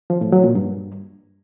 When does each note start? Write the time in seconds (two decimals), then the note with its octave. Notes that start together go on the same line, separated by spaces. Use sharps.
0.10 F3
0.21 A2
0.32 F#3
0.44 A#2
0.55 G2